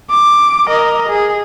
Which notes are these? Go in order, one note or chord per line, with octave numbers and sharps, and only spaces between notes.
D6
A#4 D#5
G#4